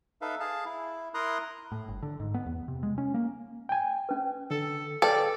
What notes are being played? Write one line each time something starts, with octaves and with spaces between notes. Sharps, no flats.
D#4 A4 B4 E5 F5
G#4 F5 A5
E4
E4 A#4 A#5 C6 D#6 F#6
A2
G1
D3
G#2
B3
E2
C3
G#3
C#4
A#3
G5 G#5
C#4 B4
D3 A4
A4 B4 D5 F5 G5 A6